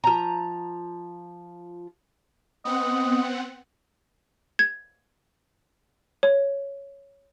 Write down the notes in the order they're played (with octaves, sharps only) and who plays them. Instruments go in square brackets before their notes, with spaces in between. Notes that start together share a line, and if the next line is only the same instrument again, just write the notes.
[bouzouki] F3 A#5
[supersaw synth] B3 C4 F#5 [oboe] D#5
[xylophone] G#6
C#5